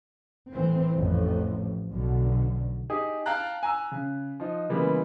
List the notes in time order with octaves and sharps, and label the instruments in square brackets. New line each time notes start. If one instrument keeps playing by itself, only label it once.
[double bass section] A2 E3 C4
A1 F2 A2
B1 B2 D3
[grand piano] D#4 G4 G#4 D#6
F5 G5 A5 A#5 F#6
G#5 A#5 E6
C#3
F3 D#4
C#3 E3 G3 G#3 A#3 B3